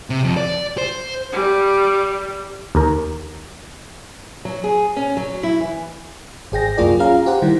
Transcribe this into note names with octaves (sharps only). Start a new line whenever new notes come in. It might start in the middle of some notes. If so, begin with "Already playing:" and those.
C3
F2
D5
C5
G3
D#2 A#4
F#3
G#4
C#4
F#3
E4
E3
G#1 G#4 G5 A#6
C2 F#2 A#3 F4 G#4 D5
C#4 F4 G#4 F5 A#5
G4 C5 F#5
D#3 G3 E4